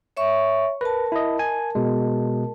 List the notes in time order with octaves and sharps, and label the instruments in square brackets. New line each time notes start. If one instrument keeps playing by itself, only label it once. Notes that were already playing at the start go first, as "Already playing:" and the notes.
[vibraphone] C#5 E5 C#6
[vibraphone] A#4 A5 [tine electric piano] B4
[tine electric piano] E4 D#5
G#5
B2 G#3